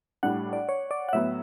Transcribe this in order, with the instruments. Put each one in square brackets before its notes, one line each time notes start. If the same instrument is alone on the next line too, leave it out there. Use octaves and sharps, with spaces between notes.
[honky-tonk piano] A2 G3 D4 [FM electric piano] F#5
[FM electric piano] D5
C#5
D5
F#5
[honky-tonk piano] A2 F#3 B3 [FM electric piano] E5